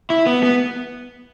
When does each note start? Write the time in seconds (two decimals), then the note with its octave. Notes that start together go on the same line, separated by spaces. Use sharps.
0.10 E4
0.26 B3
0.43 B3